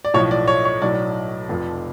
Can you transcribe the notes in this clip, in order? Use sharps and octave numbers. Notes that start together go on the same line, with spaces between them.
D5
B1 A2 F3 C#5
D5
C#5
C#5
B1 A2 F#3 D5
F1 F2 F3